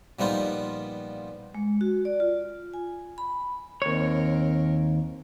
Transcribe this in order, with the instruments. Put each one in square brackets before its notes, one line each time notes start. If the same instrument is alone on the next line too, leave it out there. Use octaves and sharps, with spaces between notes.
[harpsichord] A#2 F3 G3 B3 D#4 F4
[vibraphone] G#3
F#4
D5
F4
G#5
B5
[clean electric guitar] D#2 C#5 [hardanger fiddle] C4 A#4